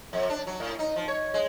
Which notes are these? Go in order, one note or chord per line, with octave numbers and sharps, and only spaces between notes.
F2
D4
F#3
A2
D#4
F3
C#5
G#3